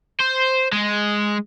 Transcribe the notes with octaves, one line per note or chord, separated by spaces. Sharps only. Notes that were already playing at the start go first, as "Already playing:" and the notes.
C5
G#3